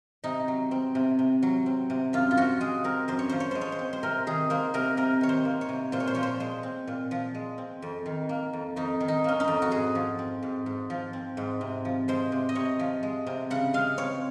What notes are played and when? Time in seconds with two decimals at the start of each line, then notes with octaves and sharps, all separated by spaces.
0.24 C3 D#4
0.48 F#3
0.71 C4
0.95 C3
1.19 C3
1.43 F#3
1.66 C4
1.90 C3
2.13 F#2 F4
2.31 F4
2.37 F3 F#4
2.61 G#3 G#4
2.84 C4 A#4
3.08 F#2 C5
3.19 C#5
3.29 F3 C5
3.40 C#5
3.51 G#3 C5
3.61 C#5
3.72 C5
3.79 C4
3.93 C5
4.03 C3 A#4
4.27 D#3 G#4
4.50 A#3 C5
4.74 C3 A#4
4.97 C3 A#4
5.21 D#3 C#5
5.29 C5
5.45 A#3
5.61 C#5
5.69 C3
5.92 A#2 C5
6.00 C#5
6.07 C5
6.15 F3 C#5
6.23 C5
6.40 G#3 C5
6.63 C4
6.87 A#2
7.11 F3
7.35 G#3
7.58 C4
7.82 F2
8.06 D#3
8.29 A#3
8.53 F2
8.76 F2 D#4
9.00 D#3
9.08 D#4
9.24 A#3 C#4
9.40 D#4
9.48 F2
9.62 F#4
9.71 G#2 G#4
9.95 F3
10.19 C4
10.42 G#2
10.66 G#2
10.90 F3
11.13 C4
11.37 G#2
11.61 C3
11.85 F3
12.08 G#3 C5
12.32 C3
12.49 D#5
12.55 C3 C#5
12.79 F3
13.03 G#3
13.26 C3
13.50 C#3 F#5
13.74 G#3 F5
13.97 C4 C#5